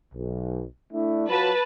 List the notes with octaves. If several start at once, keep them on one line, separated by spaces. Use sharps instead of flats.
B1
A3 D4 E4
F#3 F4 B4 A5